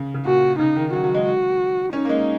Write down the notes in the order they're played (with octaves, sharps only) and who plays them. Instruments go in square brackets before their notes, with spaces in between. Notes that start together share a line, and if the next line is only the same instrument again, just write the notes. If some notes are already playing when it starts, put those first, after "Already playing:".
Already playing: [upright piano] C#3
C#3
[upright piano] A#2 [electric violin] F#4
[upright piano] C#3 [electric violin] D#4
[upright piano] D#3
[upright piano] F#3 [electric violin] F#4
[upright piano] F#3
G#3
[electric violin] F#4
[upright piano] C#4 [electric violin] D#4
[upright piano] A#3
G#3